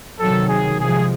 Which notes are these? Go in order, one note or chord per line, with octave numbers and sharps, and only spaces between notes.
C3 D#3 F#3 A4
G#4
C3 F3 G#3 G#4